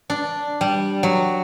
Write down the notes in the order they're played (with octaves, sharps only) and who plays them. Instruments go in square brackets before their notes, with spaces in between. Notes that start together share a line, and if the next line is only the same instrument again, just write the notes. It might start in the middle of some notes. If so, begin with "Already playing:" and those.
[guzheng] D4
G3
F#3